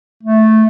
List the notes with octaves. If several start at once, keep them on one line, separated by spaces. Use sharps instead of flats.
A3